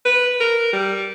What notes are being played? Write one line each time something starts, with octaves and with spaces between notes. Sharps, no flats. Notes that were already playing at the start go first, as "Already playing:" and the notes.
B4
A#4
G3